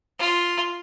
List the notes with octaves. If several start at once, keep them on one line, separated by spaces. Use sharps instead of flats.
F4